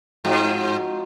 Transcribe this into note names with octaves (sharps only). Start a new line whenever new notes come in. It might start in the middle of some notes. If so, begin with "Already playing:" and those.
G#2 F3 C4 D#4 F#4